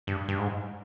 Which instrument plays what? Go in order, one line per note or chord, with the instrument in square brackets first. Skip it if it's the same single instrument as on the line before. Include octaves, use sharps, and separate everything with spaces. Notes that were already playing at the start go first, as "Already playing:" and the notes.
[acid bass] G2
G2
G#2